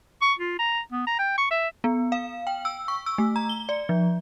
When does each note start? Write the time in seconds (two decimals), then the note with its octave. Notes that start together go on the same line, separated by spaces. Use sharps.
0.21 C#6
0.39 F4
0.59 A#5
0.92 B3
1.07 A#5
1.19 G5
1.38 C#6
1.51 E5
1.84 B3
2.12 F5
2.47 G5
2.65 E6
2.88 C#6
3.06 E6
3.18 A3
3.36 A#5
3.49 G7
3.69 D5
3.89 F3